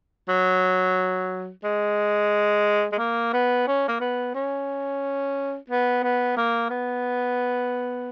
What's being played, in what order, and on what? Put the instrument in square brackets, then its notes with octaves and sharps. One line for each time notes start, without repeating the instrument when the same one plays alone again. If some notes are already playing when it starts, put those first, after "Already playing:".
[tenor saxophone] F#3
G#3
G#3
A#3
B3
C#4
A#3
B3
C#4
B3
B3
A#3
B3